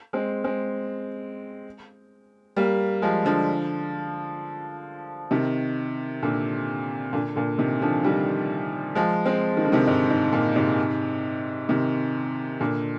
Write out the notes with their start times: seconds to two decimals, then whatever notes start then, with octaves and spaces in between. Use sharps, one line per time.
0.13 G#3 C4
0.44 G#3 C4
2.56 G3 A#3
3.02 F3 G#3
3.25 D3 F3
5.31 C3 D#3
6.22 A#2 D3
7.13 A#2 D3
7.36 A#2 D3
7.58 C3 D#3
7.81 D3 F3
8.04 D#3 G3
8.95 F3 G#3
9.25 G#3 C4
9.57 D#3
9.65 D3
9.72 C3 D#3
9.87 G#2
10.10 G#2
10.33 A#2
10.56 G#2 C3
11.69 C3 D#3
12.61 A#2 D3